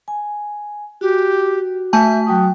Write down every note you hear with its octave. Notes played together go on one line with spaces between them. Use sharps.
G#5
F#4 G4
A3 E5 G#5 A5
F#3 F#4 G5 D#6